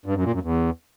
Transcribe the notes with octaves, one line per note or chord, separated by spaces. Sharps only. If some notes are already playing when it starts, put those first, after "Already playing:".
G2
F#2
A#2
F#2
E2